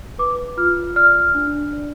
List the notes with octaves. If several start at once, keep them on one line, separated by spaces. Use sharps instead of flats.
B4 D6
F4 F6
D5 F6
D4
D5